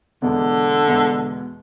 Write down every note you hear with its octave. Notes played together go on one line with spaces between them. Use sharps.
E2 B2 D3 G#3
E2 B2 G#3